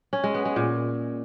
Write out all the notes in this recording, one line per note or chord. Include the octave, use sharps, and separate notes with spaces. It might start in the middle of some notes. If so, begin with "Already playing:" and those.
C#4
G#3
B3
G#3
A#2